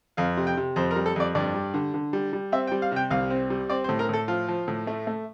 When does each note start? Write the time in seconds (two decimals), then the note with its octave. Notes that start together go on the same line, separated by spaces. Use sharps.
0.17 F2 F5
0.37 C3
0.47 G5
0.57 C3
0.76 F2 C5
0.91 A#4
0.96 G3
1.06 A4
1.16 F2 D5
1.35 G2 D5
1.54 G3
1.74 D3
1.94 D3
2.13 G3
2.33 G3
2.52 C4 E5
2.67 G5
2.72 G3
2.82 F5
2.92 C3 G5
3.11 C2 F5
3.30 C4
3.50 G3
3.70 C4 D5
3.84 C5
3.89 A2
3.99 A#4
4.09 A2 A4
4.28 F3 F4
4.48 F3
4.68 A2
4.87 A3
5.07 A3